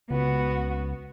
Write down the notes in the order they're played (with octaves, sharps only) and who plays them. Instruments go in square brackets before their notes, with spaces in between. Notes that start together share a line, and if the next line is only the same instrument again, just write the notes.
[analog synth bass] C#2 [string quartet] B3 F#4